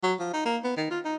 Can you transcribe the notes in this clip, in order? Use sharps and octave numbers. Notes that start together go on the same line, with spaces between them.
F#3
F3
D#4
A#3
B3
D#3
F4
D#4